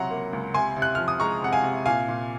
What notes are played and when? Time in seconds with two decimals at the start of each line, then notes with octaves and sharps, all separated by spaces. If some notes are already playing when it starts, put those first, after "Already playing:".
Already playing: C#2 C3 F#3 F#5 A#5 C6
0.10 A#3
0.33 C#2
0.54 C3 G#5 C6
0.76 C3
0.82 F#6
0.95 F3 F6
1.08 D#6
1.20 G#3 A#5 C#6
1.42 C3 F#5
1.53 F5 G#5
1.64 C3
1.86 A#2 F5 G#5
2.08 A#2